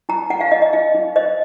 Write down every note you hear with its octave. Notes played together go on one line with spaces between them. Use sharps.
D#4 A#5
D#4 F#5
F5
D#4 D#5
D#5
D#4 F5
D#4
C5 D#5